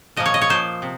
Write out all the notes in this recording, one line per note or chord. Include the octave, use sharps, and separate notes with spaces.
A#2 F3 A#3 D#5
C#5
D#5
C#5
A#2 F3 A#3 C5
C3